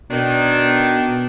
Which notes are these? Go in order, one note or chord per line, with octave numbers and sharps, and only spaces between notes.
B2 D#3 D4